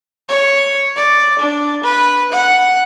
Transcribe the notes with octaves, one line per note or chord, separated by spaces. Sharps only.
C#5
D5
D4
B4
F#5